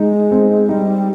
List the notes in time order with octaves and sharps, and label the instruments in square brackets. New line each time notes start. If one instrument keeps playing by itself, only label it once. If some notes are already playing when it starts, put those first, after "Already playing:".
Already playing: [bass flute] G#3 [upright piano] D#4
[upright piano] C4
[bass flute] G3 [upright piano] D#4